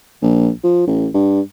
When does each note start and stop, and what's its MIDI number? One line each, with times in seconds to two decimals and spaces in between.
0.22 0.50 34
0.64 0.87 53
0.87 1.08 33
1.14 1.41 43